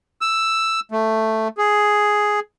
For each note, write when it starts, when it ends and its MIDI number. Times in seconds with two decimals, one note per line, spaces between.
0.21 0.80 88
0.92 1.48 57
1.58 2.40 68